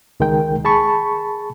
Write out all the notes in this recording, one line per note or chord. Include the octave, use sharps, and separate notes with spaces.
C#2 D#3 G#3 A#4 G5
G#4 A5 B5 C#6